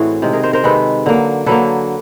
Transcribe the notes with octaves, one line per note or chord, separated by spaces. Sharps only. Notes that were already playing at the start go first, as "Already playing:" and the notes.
Already playing: A2 E3 A3 C4 F#4 G#4
C3 D#3 G#3
G#4 A#4
A#4 C5
A#4 C5
C3 D#3 G#3 A4 B4
D3 F#3 A#3
D3 F#3 A#3 A4 B4